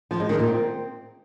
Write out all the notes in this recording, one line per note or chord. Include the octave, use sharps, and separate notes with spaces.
F3
G#3
D#3
A#2
C4